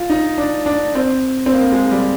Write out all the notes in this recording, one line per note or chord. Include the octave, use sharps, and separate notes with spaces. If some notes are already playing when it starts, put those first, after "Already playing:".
Already playing: F4
D#4
D4
D4
C4
C4
A#3
G#3
G3